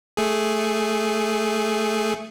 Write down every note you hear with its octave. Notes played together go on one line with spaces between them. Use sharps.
A3 G#4